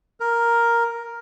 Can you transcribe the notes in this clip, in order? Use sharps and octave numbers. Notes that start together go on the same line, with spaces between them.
A#4